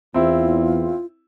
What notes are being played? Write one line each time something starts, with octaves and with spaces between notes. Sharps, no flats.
E2 C4 E4 F4